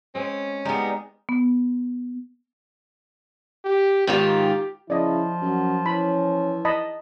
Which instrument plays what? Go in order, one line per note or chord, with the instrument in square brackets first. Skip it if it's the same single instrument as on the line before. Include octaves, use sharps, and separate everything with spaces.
[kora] G#3 C4 [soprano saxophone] C#4
[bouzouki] G3 B3 [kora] G#3 D#4 G#4 [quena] A#5
[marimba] B3
[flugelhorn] G4
[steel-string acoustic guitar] G#2 D#3 F4 [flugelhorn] G4
[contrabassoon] C#3 [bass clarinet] F3 [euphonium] E4 [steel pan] D5 D#5
[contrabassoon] F#2 [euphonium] F#4
[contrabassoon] E3 [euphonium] C#4 [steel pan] B5
[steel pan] D#5 A5 B5